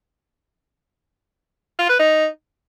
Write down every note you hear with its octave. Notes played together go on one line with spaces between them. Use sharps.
F4
B4
D#4